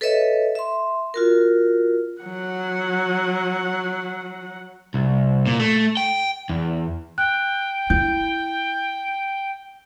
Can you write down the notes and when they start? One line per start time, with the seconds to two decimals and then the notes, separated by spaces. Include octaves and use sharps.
0.01 A4 B4 C#5 D#5 E5
0.55 E5 C6
1.14 F4 F#4 A#4
2.21 F#3 F#5
4.94 C2
5.46 A#2
5.59 A3
5.97 G5
6.50 E2
7.18 G5 F#6
7.90 E4 G6